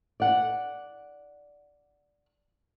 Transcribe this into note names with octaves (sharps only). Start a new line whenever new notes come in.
D5 F#5